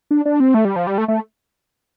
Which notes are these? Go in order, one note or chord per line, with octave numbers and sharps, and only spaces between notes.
D4
D4
C4
A3
G3
F3
G3
A3
A3